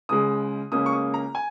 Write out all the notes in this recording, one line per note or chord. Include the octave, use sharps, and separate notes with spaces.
C#2 C#3 G#3 D#6
C#2 C#3 A#3 C#4 D#6
C#6
D#6
A#5
G#5